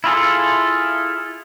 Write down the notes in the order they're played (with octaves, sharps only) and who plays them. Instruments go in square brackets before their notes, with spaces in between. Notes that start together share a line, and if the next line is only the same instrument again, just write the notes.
[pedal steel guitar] E4 F4 G#4 A4